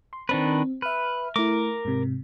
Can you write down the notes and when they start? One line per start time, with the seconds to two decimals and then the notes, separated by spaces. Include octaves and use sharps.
0.13 C6
0.29 D#3 C4 D4 B4
0.82 B4 E5 F6
1.36 A3 E4 A#4 D6
1.85 G#2 C3